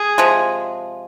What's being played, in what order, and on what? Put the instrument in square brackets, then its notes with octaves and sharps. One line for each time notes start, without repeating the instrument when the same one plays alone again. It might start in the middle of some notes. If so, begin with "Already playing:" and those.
Already playing: [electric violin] G#4
[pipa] C3 F3 G#3